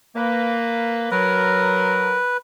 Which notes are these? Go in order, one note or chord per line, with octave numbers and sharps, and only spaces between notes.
A#3 B4
F#3 A#4 B4